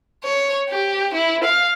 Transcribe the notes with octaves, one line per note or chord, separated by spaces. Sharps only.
C#5
G4
E4
F5